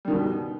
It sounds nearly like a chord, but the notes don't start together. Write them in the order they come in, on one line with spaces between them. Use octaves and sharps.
G3 D#3 B2